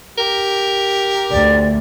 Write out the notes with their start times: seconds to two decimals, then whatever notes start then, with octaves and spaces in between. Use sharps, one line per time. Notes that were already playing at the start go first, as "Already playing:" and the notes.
0.18 G4 A#4
1.31 D2 D5